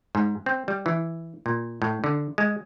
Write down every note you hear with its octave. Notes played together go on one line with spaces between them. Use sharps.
G#2
C4
G3
E3
A#2
A2
D3
G#3